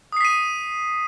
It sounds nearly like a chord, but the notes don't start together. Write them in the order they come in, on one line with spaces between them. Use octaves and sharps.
D#6 C7 B6 D#7